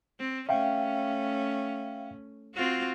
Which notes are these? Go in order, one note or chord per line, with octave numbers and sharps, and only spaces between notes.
C4
A3 C#4 E5 F5 G5
C4 F4 F#4